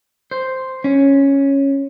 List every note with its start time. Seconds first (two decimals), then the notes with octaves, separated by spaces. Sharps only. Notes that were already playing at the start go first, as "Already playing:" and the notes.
0.31 C5
0.84 C#4